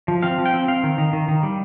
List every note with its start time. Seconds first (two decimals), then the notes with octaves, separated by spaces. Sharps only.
0.08 F3
0.23 C4 F5
0.38 F3
0.46 G5
0.54 C4
0.68 C4 F5
0.83 D#3
0.98 D#3
1.13 D#3
1.28 D#3
1.43 G3